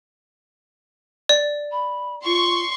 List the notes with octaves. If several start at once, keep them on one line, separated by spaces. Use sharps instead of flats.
D5
B5
F4 C6 C#6